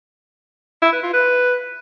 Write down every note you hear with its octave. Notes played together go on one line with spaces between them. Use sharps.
E4
B4
F4
B4